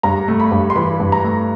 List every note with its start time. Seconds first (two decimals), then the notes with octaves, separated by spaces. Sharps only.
0.03 G2 A#5
0.28 A3
0.40 B5
0.52 G2
0.70 C6
0.76 E3 B5
1.00 G2
1.12 A#5
1.24 A3